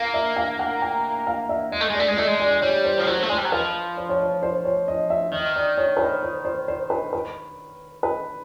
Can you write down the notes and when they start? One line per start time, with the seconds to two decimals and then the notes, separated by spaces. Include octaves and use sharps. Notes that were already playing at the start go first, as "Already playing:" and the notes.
Already playing: A#3 F5
0.14 E5
0.36 F5
0.59 F#5
0.82 G5
1.27 F5
1.49 E5
1.72 G#3 D#5
1.81 A3
1.90 G#3 D5
2.00 A3
2.08 G#3 D5
2.17 A3 D#5
2.28 G#3
2.40 D5
2.51 D5
2.62 G3 C#5
2.85 C5
2.99 F3
3.07 F#3 C5
3.23 A3
3.29 G#3 C5
3.38 G3
3.45 F#3
3.52 F3 B4
3.97 C5
4.09 C#5
4.21 C5
4.43 C5
4.65 C#5
4.88 D#5
5.10 E5
5.32 D#3 D#5
5.56 D5
5.78 C#5
5.97 B4
6.00 C5
6.23 C5
6.45 C5
6.68 C5
6.90 B4
7.13 B4
8.03 B4